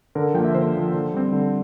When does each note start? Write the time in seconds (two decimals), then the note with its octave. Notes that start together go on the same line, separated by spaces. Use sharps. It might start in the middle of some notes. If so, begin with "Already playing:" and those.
0.15 D3 A#4
0.34 F3 A#3 G5
0.44 E5
0.55 D3 C5
0.74 F3 A#3
0.94 D3
1.14 G3 C4
1.33 D3